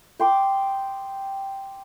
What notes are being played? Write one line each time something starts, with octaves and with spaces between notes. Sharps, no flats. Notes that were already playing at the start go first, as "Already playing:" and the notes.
G5 C6 D6 D#6